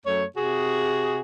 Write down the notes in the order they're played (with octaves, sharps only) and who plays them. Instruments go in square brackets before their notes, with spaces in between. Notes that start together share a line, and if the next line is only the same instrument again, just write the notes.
[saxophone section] F#2 A3 C#5
C3 F#4 G#4